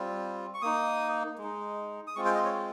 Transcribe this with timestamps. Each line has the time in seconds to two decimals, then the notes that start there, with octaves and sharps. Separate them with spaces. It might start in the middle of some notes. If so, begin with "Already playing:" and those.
Already playing: G3 C4 F4
0.54 C#6
0.62 A#3 D#4 D#6
1.38 G#3
1.43 D#4
2.07 D#6
2.16 G#3 C4 F4 C#6
2.25 G5
2.35 D#5
2.45 C#5